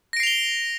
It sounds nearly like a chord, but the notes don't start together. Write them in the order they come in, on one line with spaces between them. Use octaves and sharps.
A#6 D7 C7 F7 G7